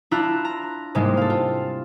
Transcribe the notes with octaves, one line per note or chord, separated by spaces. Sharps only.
D4 E4 F4 A#5 E6 F#6
A#5
G#2 C3 G3 G#3 A#3
A4 F5
F4